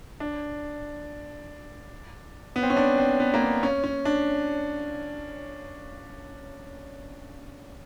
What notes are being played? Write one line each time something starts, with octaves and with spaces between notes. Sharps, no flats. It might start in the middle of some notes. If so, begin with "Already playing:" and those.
D4
B3
C4
C#4
D4
C4
B3
A#3
B3
C#4
C#4
D4